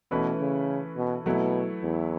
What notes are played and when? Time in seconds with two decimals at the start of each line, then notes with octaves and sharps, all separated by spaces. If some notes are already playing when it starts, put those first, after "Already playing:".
0.11 B2 E3 A3 C#4 E4 B4
0.40 C#3
0.97 B2
1.25 B2 F#3 A3 E4 B4
1.83 E2